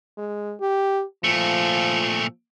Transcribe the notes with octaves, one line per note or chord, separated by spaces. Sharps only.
G#3
G4
A#2 F3 A3